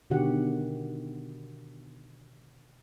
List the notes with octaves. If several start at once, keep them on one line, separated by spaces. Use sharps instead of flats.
B2 D3 D#3 F#4 G4 F#5